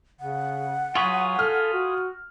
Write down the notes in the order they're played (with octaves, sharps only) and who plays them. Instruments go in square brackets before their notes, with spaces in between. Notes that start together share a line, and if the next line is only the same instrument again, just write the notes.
[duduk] C#3 [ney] F#5
[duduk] F#3 [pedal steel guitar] F4 G#4 B4 [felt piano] C#6
[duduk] A4 [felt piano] F6
[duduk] F#4